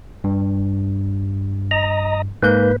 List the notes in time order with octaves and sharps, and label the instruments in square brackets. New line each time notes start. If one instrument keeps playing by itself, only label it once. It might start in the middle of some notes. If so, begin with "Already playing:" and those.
[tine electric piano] G2
[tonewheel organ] D#5 A#5
[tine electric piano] G#2 A#3 G6 [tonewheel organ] B4